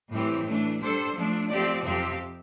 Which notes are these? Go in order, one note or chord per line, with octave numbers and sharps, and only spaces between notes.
A2 E3 G3 C4 G4
E3 A3 D4
G3 D4 A4 C5
F3 A3 D4
F3 A3 C4 G4 D5
F2 C3 F3 C4 G4